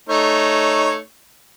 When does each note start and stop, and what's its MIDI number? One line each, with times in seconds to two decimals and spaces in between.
0.09 0.98 57
0.09 0.98 63
0.09 0.98 73